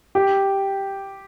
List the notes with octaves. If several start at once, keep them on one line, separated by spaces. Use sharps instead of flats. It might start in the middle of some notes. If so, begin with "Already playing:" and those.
G4